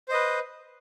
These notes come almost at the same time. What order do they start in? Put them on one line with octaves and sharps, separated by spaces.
C5 D#5 B4